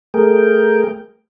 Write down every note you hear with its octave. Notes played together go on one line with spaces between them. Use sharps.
A3 G#4 A#4 G5